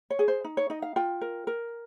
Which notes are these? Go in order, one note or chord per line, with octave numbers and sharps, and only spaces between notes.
C#5
G#4
C5
D#4
C#5
D#4 D#5
F5
F4 G5
A#4
A#4